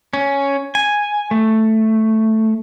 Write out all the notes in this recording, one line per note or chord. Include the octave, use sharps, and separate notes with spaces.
C#4
G#5
A3